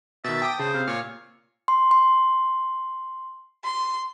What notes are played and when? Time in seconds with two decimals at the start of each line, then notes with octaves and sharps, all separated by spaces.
0.24 B2 D#3 E5 A6
0.42 G5 A5 D6 D#6
0.59 C#3 C5 A5
0.74 C3 F5
0.88 A#2 C#5 F6
1.68 C6
1.91 C6
3.64 C6